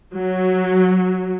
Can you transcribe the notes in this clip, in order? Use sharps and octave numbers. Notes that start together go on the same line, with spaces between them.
F#3